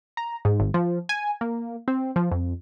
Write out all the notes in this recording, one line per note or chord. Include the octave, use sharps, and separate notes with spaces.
A#5
G#2
G#1
F3
G#5
A#3
C4
F3
F2